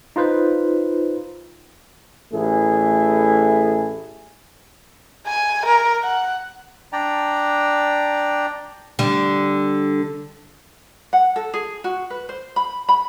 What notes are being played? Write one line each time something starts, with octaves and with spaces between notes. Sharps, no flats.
D#4 F4 B4 C5
A1 A3 E4 G#4
G#5
A#4
F#5
D4 D5 G5 A#5
D3 G3
F#5
A4
G#4
F#4
B4
C5
B5
B5